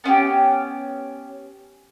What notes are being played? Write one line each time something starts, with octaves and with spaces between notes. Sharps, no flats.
B3 C#4 F4 G4